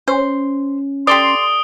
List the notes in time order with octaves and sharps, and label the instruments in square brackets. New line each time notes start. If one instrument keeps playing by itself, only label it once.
[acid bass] C#4 [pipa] C5
[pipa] G4 A4 D5 [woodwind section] C6 [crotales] D#6 D7 G7